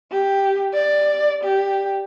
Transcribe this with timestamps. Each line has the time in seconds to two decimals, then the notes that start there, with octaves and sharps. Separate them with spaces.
0.12 G4
0.74 D5
1.44 G4